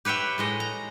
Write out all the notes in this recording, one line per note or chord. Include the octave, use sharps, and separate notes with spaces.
G4 B4 C#5 E5 G5
A2 G#3 D#5
A#5